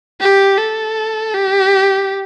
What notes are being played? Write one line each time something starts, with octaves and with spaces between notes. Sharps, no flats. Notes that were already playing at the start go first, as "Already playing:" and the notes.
G4
A4
G4